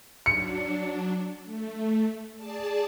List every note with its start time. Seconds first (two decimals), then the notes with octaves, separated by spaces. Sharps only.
0.26 F#3 D4 C#7
1.44 A3
2.36 G#4 D5 A5